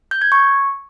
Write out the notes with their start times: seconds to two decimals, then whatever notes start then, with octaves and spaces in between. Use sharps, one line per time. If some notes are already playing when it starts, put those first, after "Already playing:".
0.11 G6
0.22 G#6
0.32 C#6